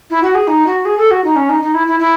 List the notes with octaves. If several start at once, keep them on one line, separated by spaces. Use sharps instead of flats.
E4
F#4
G#4
D#4
F#4
G#4
A4
F#4
D#4
C#4
D#4
D#4
E4
E4
E4